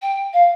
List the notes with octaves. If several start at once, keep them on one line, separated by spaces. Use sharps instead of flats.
G5
F5